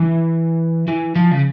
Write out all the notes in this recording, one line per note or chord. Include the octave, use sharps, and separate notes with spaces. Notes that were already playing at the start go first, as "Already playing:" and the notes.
Already playing: E3
E3
F3
C#3